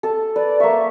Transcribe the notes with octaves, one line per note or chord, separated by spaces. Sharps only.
A4 A5
B4 D5
A#3 E5 C#6